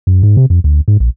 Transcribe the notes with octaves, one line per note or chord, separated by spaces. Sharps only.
F#2
G#2
C3
F2
D2
G#2
A#1